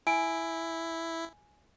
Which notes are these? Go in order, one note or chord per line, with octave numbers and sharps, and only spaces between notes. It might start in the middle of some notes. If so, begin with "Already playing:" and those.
E4 G#5 D7